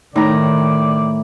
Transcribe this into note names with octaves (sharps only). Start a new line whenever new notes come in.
A2 D#3 D#4 D5 A#5